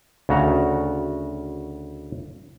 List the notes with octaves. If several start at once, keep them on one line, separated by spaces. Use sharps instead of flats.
D2 C#3 F#4 A#5